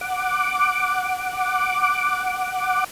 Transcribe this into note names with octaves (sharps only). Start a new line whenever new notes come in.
F#5 D6